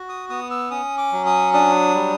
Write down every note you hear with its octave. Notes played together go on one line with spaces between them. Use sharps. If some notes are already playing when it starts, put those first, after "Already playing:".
Already playing: F#4
D#6
B3 D#6
E6
C#4 D#6
D6
F#3
D#6
D4 D#6
G3